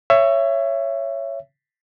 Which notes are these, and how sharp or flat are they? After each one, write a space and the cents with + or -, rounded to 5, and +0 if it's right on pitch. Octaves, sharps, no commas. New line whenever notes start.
C#5 +0 E5 +25